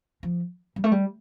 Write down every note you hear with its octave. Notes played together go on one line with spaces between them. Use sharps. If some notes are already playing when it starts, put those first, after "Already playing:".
F3
G3
A3
G3